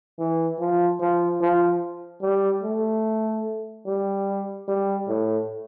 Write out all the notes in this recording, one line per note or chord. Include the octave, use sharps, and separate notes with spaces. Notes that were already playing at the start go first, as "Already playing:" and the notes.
E3
F3
F3
F3
G3
A3
G3
G3
A2